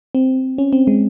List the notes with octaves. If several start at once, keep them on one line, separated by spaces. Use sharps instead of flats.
C4
C#4
C4
G#3